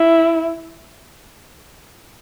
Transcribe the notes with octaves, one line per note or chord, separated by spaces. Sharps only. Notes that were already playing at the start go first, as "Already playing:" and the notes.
Already playing: E4